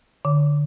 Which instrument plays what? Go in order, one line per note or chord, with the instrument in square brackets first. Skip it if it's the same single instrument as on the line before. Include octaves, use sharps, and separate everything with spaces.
[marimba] D3